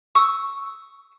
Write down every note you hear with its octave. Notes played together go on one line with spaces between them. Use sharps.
C#6 D#6 E6